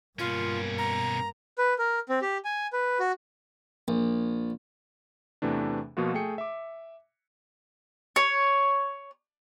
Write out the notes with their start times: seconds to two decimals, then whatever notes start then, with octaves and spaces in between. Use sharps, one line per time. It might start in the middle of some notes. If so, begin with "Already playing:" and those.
0.19 G2 B2 A#3 C#4 F4
0.78 A#5
1.58 B4
1.79 A#4
2.09 C4
2.22 G4
2.45 G#5
2.73 B4
3.00 F#4
3.88 A#1
5.42 E2 C3 E3 A3 D4
5.97 B2 F3 A#3 F4 F#4
6.14 A3 G#4 G5 C#7
6.38 E5 D6
8.16 C#5